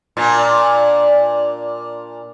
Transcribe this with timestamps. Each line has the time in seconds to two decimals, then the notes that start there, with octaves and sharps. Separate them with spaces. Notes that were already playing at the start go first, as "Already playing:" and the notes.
0.17 A#2 D4